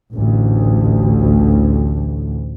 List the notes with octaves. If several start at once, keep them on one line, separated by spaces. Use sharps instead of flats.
A1 D2